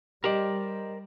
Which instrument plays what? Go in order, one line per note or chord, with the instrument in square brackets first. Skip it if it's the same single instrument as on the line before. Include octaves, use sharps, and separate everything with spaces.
[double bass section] G3 [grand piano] G4 D#5 [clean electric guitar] A#4 C5 D5